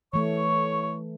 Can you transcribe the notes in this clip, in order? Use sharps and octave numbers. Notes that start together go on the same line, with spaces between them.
E3 A3 C#5 C#6